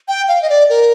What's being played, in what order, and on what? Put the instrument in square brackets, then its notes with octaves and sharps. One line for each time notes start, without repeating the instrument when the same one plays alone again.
[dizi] G5
F5
D#5
D5
A#4